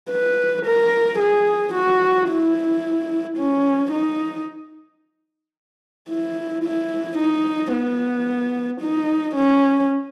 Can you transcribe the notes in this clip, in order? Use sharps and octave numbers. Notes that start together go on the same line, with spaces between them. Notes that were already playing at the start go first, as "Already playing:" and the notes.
B4
A#4
G#4
F#4
E4
C#4
D#4
E4
E4
D#4
B3
D#4
C#4